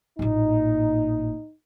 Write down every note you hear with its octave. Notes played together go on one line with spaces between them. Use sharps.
A1 A#2 D#4